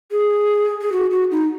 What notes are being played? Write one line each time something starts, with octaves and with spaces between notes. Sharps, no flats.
G#4
G#4
F#4
F#4
D#4